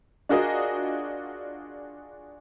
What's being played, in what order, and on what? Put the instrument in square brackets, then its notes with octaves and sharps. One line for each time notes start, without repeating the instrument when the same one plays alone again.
[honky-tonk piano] D4 F4 F#4 G#4 A#4 D#5